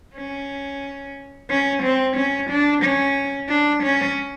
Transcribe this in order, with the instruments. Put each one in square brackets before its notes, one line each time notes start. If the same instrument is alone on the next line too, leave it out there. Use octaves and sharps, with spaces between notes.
[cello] C#4
C#4
C4
C#4
D4
C#4
D4
C#4